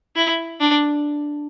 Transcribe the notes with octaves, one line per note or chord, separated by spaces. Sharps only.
E4
D4